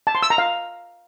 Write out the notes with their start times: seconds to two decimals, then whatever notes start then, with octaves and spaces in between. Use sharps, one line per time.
0.07 A5
0.15 C6
0.23 E6
0.30 A#5
0.38 F5